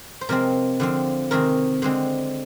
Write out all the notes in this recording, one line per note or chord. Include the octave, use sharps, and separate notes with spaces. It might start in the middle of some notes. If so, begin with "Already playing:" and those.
C5
C3 F3 G#3 C4 A#4
D3 F3 C4
C3 D#3 G#3 C4 A#4
D3 G#3 C4 C5